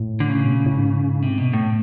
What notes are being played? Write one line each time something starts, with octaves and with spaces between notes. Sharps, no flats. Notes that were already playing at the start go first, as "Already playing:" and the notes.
Already playing: A2
D3
C#3
B2
A#2
A2
G#2
C3
B2
A2